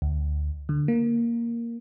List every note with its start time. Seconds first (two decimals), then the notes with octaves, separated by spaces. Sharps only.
0.02 D2
0.69 D3
0.88 A#3